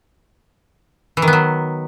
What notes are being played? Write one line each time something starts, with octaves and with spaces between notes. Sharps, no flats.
E3
D#3
B3
F#3